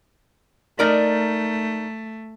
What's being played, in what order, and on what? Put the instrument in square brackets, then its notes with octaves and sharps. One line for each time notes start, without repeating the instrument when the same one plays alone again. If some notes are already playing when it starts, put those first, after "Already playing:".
[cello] A3 [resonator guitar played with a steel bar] D#4 A#4 D5